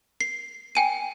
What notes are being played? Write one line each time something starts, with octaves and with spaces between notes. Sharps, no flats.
C7
G5 G#5 D#7